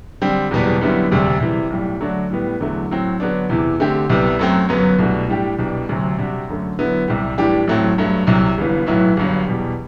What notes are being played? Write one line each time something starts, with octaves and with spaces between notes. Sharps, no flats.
D3 G3 C4
F#1 E2 B2 G3 B3
F#2 D3 G3 B3 E4
E1 D2 C3 G3
C3 E3 G3
B1 A2 G3
D3 F#3 A3 D4 F#4
A2 G3 B3
E2 D3 F#3 A3
A2 F#3 C4
D3 F#3 B3 D4
E2 C3 E3
D3 A3 C4 G4
C2 C3 G3 B3
F#2 F#3 A3 C4
G1 F#2 F#3 B3
C2 B2 A3 D4 F#4
A2 G3 D4 G4
C2 B2 G3 D4
D2 C3 F#3
C3 G3 D4 F#4
F#2 D3 A3
D3 F#3 B3 E4
C2 C3 G3
A2 E3 G3 D4 G4
A1 A2 F#3 A3 C4
G2 F#3 A3
C2 C3 F#3
G1 G2 E3 B3
B1 A2 F#3 B3 E4
G1 G2 F#3
E2 B2 G3